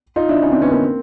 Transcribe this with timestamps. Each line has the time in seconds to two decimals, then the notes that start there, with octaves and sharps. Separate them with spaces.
0.16 D#4 F4
0.29 D4 E4
0.42 C#4 D#4
0.52 C4 D4
0.62 B3 C#4
0.71 A#3 C4